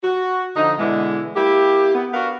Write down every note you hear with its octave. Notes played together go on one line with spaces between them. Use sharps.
F#4
D3 F3 D#4
B2 D3 E3 G#3
A#3 E4 G4
B3
B3 D4 F#4 A#4 F5